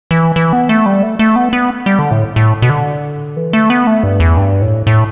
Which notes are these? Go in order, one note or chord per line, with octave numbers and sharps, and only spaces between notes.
E3
E3
B3
A3
G3
A3
A3
B3
B3
G3
D3
A2
A2
B2
D3
E3
A3
B3
A3
G2
E2
G2
A2
A2